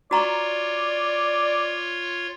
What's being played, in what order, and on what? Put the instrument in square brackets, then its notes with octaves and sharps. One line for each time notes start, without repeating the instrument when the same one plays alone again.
[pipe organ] F4 C#5 [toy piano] F#4 A#5 C#6 [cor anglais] D5